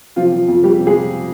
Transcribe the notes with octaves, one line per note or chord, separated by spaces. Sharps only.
C3 F3 F4
F3
F2
G3 G#3 G4
C3
G#3 G#4
F3